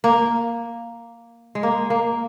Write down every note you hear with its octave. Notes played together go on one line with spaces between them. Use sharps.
A#3
G#3
A#3
A#3